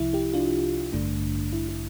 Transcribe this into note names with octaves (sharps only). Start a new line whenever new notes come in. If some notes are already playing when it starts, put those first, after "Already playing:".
Already playing: C2 C3 F3 E4
E4 G4
D4 F4
A1 G2 D3 A3 D4
E4
E4